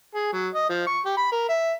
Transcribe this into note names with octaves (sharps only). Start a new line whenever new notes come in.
G#4
F#3
D#5
F3
C#6
G4
B5
A#4
E5